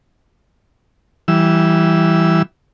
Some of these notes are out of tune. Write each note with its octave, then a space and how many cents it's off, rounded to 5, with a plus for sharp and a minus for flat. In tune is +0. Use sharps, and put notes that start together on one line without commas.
E3 +0 G3 -15 E6 +0